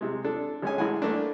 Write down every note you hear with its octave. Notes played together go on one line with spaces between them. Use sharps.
C3 G#3
D4 A4
G#1 G#3 C#4 G#5
A1 G#3 E4 F#5 G#5
A3 A#3 D4